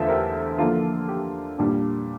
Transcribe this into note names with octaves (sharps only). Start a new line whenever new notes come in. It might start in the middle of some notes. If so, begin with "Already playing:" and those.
Already playing: E2 D3 A3 F4 A4 C5 E5
G4 A#4
D3 F3 A#3 D4 F4 A4
G4
A#2 G3 D4